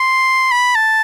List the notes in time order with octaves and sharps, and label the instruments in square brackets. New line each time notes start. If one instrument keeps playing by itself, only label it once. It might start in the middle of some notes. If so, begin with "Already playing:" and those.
Already playing: [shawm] C6
B5
A5